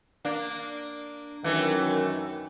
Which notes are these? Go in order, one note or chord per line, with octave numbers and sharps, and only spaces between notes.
A#3 D4
F#2 D#3 E3 A3